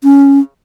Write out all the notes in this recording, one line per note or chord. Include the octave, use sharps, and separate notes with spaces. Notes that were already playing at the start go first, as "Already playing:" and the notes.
C#4